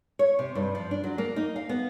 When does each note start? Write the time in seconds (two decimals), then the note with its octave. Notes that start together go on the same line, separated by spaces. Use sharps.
0.19 C#5
0.39 C3
0.55 G2
0.75 F3
0.91 D4
1.04 F#3
1.18 A#3
1.36 D#4
1.56 F5
1.69 B3